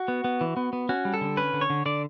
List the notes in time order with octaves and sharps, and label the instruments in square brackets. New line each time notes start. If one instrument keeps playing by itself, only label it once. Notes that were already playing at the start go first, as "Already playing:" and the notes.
Already playing: [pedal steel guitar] F#4
B3
B3
E3
B3
B3
C#4 F#4
G3
A4
D3
C#4 B4
D3
C#5
D3
D3 D5